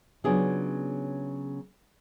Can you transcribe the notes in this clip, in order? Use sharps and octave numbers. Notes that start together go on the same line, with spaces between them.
C#3 F#3 B3 D4 F4 G#4